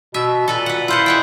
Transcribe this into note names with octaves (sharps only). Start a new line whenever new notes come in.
B2 E5
A#2 A4 B4
B4 F#5
E4 F4 C5 F#5
G#3 F#5 G5